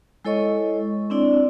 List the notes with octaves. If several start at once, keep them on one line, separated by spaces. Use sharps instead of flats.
G#3 E4 A4 C#5 D#5 C#6
C4 D4 E4 D5